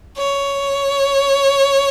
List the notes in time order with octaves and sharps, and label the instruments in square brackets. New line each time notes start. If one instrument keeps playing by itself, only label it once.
[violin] C#5